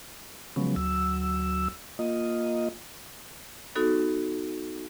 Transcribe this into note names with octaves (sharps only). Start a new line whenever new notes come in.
C#3 F3 F#3 G#3 B3 C#4
D2 F#3 E6
A#3 F4 D#5
B3 D#4 F#4 A4